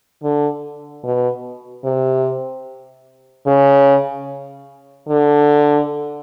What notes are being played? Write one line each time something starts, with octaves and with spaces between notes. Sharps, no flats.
D3
B2
C3
C#3
D3